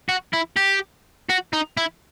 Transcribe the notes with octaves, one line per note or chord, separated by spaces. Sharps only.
F#4
E4
G4
F#4
D#4
E4